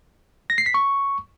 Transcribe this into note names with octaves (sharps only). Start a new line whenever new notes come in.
A#6
C7
B6
C#6